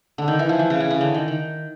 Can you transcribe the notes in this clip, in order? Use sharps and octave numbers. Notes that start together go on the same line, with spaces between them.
D3
D#3
E3
F3
E3
C#3
C#3
C#3
D3
D#3
D#3